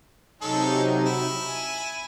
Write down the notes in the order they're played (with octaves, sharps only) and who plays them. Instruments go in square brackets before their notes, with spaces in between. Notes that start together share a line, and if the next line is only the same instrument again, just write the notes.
[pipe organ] C3 F#3 D#4 [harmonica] G#3 C#4 A4
[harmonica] E4
[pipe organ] G#5